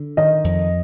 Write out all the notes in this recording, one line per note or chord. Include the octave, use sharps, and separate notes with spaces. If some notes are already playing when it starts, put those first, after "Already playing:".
Already playing: D3
D#3 D#5
F2